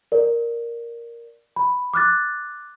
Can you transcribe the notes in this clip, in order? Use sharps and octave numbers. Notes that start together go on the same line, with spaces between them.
A#4 D5
B5
D6 F6 F#6 A6